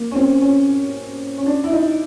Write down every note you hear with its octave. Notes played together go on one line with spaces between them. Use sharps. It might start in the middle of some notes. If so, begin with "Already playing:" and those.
Already playing: A#3
C#4
C4
C#4
C#4
D4
E4
D#4